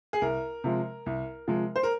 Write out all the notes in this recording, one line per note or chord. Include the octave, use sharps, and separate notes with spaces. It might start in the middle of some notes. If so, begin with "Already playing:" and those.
G#4
C2 A#4
C3 F3 G#3
C2
C3 F3 G#3
C5
A#4